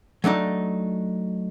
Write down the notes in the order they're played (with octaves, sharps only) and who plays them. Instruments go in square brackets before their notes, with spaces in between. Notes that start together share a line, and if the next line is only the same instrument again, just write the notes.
[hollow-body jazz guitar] F#3 A3 D4 D#4